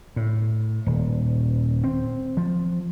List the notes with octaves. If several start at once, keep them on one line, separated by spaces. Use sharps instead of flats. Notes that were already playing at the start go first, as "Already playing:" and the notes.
A2
D#1
C4
F3